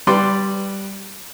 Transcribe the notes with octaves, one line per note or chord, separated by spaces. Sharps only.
G3 B4 D5 C6